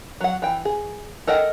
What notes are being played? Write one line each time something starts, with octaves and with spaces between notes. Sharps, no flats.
F#3 F#5
E3 G5
G#4
A4 A#4 D#5 F#5 G5